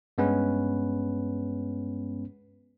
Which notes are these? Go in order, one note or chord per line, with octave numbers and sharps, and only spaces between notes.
G2 G#3 B3 C#4 B4